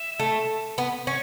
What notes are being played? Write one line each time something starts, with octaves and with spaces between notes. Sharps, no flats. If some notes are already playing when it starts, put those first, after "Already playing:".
Already playing: E5
A3
B3
C#4 C#6